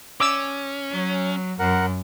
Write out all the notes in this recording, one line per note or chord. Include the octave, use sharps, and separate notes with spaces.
C#4 D6 E6
F#3
F#2 A#4 F#5